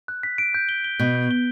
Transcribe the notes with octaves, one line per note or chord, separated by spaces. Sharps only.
F#6
B6
D7
G6
G7
G7
B2 G6
G6
G7